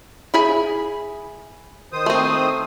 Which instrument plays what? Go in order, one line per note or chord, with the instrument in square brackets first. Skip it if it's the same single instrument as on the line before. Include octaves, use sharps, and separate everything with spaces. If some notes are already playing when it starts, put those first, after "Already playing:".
[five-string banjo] E4 G#4 B5
[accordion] D#3 C5 D#6
[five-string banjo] A3 C4